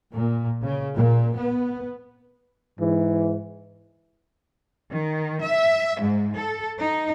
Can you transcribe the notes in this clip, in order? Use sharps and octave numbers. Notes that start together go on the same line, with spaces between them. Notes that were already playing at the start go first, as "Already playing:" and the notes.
A#2
C#3
A#2
B3
G#2 E3
D#3
E5
G#2
A4
D#4